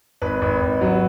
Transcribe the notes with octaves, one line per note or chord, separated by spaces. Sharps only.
G#1 B4
G#1
G#1
F#3